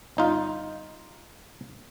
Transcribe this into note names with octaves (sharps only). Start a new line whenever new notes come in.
G1 D#4 F4